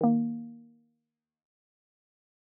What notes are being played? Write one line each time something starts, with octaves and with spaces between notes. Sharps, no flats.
D#3 A#3